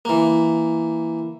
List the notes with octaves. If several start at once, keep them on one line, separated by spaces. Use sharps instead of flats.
E3 A#3